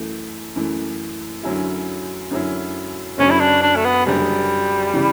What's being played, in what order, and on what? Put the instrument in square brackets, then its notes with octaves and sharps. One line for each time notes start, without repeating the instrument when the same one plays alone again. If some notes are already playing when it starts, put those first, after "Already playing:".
Already playing: [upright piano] F#2 E3 A3
F#2 E3 A3
F#2 D3 F#3 C#4 E4
F#2 D3 F#3 C#4 E4
[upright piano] F#1 F#2 D3 F#3 [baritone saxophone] C#4
[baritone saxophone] E4
D4
D4
A3
B3
[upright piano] F#1 F#2 D3 F#3 [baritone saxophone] G3
[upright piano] C#3 E3